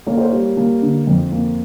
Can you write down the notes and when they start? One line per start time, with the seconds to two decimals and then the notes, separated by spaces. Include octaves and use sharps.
0.06 A#3 C#5
0.18 C5
0.28 G3 C#5
0.57 A#3
0.82 D3
1.07 F2
1.32 A#3